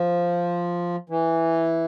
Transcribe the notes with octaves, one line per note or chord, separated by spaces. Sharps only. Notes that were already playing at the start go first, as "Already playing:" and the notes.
Already playing: F3
E3